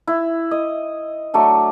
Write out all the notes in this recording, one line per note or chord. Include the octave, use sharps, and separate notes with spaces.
E4
D#5
F#3 A3 D4